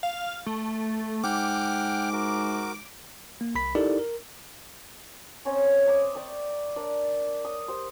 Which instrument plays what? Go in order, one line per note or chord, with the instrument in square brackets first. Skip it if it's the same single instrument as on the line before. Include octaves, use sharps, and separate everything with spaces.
[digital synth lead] F5
A3
[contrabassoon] G#2 [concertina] F#5 G5 F6 [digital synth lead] D6
[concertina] F#4 A#4
[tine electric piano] A#3
C2 B5 B6
D#4 E4 G4 A4 A#4 D5
A#4
[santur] C4 C#4 C#5 D#5
E5 A#5 D6 D#6
D5 G5 C#6
D4 A#4 D5
D#6
G4 C5